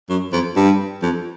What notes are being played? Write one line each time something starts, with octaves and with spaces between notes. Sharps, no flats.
F#2
F2
G2
F2